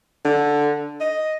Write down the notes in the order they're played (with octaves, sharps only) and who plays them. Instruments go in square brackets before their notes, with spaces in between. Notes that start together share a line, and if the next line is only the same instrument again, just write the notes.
[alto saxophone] D3
D#5